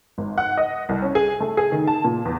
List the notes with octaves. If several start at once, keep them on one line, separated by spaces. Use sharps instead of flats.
G#1
F#5
D#5
C2
C#4
G#4
A3
G#4
D#3
A5
A#2
E2